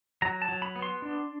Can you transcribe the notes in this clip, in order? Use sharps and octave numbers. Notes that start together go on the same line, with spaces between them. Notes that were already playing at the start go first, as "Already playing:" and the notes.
F#3 A#5
A5
F#3
B5
B3
C6
D4